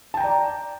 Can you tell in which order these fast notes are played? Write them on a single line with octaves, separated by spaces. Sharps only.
A5 G5 A#5 D5